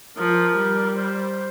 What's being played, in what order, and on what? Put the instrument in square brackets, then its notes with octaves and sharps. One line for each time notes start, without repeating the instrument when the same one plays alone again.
[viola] F3 [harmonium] A#4
[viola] G3
[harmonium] C5